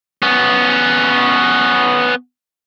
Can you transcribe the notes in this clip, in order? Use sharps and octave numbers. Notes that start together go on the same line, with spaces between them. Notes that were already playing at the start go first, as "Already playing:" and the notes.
B3 C#4